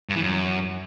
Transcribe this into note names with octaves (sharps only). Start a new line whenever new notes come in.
G2
E3
F#2